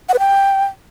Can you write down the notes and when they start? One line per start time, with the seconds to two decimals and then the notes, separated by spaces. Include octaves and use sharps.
0.09 F#5
0.14 B4
0.19 G5